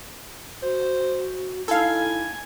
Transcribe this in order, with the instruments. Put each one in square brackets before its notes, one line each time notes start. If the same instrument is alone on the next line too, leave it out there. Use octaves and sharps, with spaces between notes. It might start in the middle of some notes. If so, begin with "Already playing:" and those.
[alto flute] F#4 [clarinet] C5
[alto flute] D#4 [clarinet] E4 [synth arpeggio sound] A4 F5 [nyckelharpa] G#5